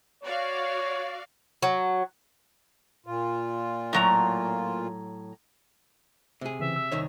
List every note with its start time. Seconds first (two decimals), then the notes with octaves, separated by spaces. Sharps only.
0.23 F#4 C#5 D5 F5
1.62 F#3
3.06 A#2 F4
3.93 A2 F#3 A#5
6.41 C3 G#4
6.60 C#3 E3 C4 E5
6.76 E6
6.92 C2 D#3 C#5